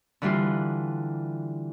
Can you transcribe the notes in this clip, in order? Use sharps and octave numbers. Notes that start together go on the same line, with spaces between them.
D3 E3 G3 F4